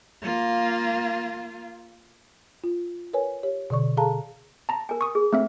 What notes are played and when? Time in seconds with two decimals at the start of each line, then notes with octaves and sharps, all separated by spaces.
0.22 A#3 F4
2.64 F4
3.13 A#4 B4 C#5 G#5
3.43 G4 C#5
3.70 B2 D3 D5 C#6
3.97 G#4 A4 F5 A5 A#5
4.69 A5 A#5
4.89 A#4 G#5
5.01 C#6 D#6
5.15 G#4
5.33 A3 C4 E5